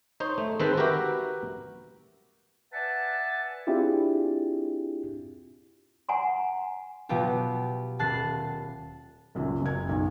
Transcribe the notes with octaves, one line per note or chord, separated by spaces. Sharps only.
D#4 C5 C#5
A3
D#3 G#3 C4 A4 B4 C5
F#4 G4 A#4 B4 E5 G5
B4 D5 E5 F#5 G#5 A5
C4 D4 E4 F4 G4 G#4
F#5 G#5 A#5 C6
B2 F#3 B3 F4 G4
D#1 A5 F#6 A6 C7
C#2 F#2 A#2
F#1 G#6
B1